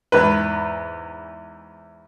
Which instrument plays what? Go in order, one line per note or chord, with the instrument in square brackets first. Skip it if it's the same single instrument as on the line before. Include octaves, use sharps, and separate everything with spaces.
[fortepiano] E2 G#2 B4